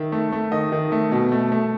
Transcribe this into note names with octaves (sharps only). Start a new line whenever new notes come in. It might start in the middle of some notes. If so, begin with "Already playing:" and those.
Already playing: D#3 E5
A3
A3
D#3 D#5
D#3
A3
B2
A3
A3